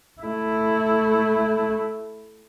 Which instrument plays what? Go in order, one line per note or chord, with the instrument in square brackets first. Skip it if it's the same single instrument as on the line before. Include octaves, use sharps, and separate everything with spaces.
[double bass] A3 E4